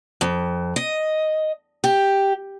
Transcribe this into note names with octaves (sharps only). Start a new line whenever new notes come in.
F2
D#5
G4